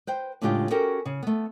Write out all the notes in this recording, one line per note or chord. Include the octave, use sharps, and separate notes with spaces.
B4 C5 G5
A2 C#3 G#3 D4 F4 G4
C#4 F#4 G4 A4 A#4
C#3
A3 B3